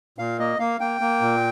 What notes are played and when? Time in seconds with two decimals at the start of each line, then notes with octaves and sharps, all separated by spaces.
0.18 A#2 F5
0.39 A#3 D#5
0.59 A#3 F5
0.80 A#3 G5
1.01 A#3
1.21 A#2